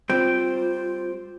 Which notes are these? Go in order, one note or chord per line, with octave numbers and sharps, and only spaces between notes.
G3 C4 F4 C5 G5